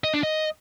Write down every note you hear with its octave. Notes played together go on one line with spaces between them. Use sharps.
D#5
D4
D#5